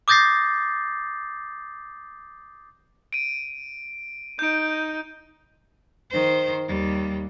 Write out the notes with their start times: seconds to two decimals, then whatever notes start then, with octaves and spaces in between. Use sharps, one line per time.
0.08 D6 D#6 G6 A6 A#6 C7
3.13 D7 D#7
4.39 D#4 G6 D7
6.11 D#3 C5
6.68 D#2 G3